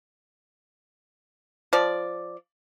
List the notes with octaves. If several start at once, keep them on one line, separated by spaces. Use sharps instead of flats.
F3 D5